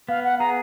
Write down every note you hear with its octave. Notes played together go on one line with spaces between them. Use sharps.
B3 F5
F#5
G#4 A#5